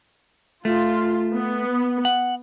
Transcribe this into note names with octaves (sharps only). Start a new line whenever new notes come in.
A3 F4
B3
F#5